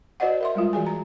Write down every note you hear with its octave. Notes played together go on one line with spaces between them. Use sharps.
F#4 C5 D5 D#5 F#5
A#4 E5 C6
G3 G#3 F4
E3 F#4 G#4 G#5
A#5